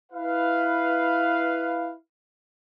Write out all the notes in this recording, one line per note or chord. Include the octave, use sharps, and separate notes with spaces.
E4 B4 F5